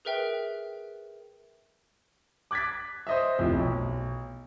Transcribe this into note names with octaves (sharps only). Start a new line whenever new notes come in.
G#4 A#4 B4 E5 G5
D6 F#6 G#6 A6 B6
C5 D#5 E5
D1 F2 E4
B1